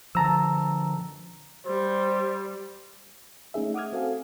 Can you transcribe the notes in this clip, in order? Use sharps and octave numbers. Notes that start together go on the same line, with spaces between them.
D3 F3 A5 A#5 E6
G3 C5
A3 C#4 D#4 G#4 E5
F#5 D6 D#6 F6 G#6
C4 F#4 A4 F5 G#5